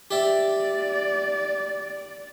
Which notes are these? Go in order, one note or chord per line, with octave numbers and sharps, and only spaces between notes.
G4 D5 E5